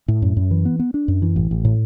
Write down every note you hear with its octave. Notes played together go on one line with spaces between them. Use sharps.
A2
F#2
F#2
E3
B3
B3
D4
F#2
E3
A1
A1
A2